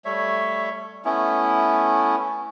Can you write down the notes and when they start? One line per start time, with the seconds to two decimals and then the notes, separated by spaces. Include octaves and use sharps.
0.05 G3 A3 C#5 E5
1.05 A3 B3 C#4 E4